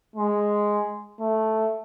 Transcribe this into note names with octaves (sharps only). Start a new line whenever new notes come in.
G#3
A3